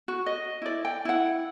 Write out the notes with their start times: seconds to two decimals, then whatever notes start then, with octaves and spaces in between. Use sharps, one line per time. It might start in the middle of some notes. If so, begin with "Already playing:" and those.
0.08 F#4
0.26 D#5
0.62 E4 D5
0.85 G5
1.05 E4 F#5